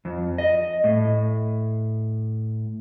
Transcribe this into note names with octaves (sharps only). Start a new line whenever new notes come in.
F2
D#5
A2